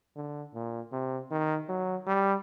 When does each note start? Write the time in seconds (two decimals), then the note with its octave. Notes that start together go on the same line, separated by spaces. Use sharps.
0.16 D3
0.54 A#2
0.92 C3
1.31 D#3
1.69 F#3
2.07 G3